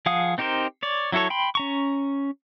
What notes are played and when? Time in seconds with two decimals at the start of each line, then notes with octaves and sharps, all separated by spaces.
0.06 F3 G#4 F5 F#5 D#6
0.38 C4 D#4 G4 A#4 C5
0.83 C#5 D5
1.12 F#3 E4 F#4 A4 C#5
1.30 G5 B5 C6
1.55 C#4 A#5 C#6